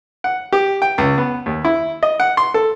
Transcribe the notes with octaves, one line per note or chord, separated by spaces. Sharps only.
F#5
G4
G5
C#2
B3
D#2
E4
D#5
F#5
C6
A4